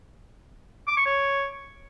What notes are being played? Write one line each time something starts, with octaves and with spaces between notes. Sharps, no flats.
D6
C#6
C#5